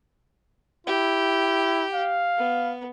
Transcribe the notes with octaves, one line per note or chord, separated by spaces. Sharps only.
E4 G4
F5
B3